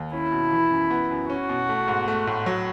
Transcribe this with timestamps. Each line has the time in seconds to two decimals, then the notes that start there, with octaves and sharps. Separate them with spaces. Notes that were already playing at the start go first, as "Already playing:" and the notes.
Already playing: D#2
0.13 C#4 E4
0.32 B2
0.53 E3
0.71 F#2
0.90 B3
1.11 F#2
1.30 C#4 F#4
1.49 B2
1.69 A3
1.88 G#2
2.08 A3
2.27 A2
2.46 F#3